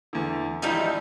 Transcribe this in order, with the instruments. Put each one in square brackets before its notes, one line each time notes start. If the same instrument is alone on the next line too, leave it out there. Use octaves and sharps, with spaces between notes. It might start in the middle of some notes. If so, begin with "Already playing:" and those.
[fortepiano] E2 D3
[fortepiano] G#1 F3 E4 [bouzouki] G3 D#4